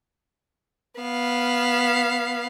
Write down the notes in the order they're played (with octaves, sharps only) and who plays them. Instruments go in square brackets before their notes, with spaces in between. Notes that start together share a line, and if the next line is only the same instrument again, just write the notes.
[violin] B3 F5